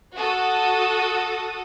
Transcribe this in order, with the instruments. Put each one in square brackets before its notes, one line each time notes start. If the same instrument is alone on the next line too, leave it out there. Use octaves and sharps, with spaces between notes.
[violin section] F#4 A4 D#6